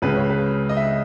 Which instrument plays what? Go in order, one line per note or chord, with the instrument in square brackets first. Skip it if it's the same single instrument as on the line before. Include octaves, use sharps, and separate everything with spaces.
[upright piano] C#2 C#3 G#3 B4
C#5
B4
D#5
E5